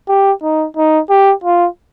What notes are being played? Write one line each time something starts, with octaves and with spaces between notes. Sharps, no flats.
G4
D#4
D#4
G4
F4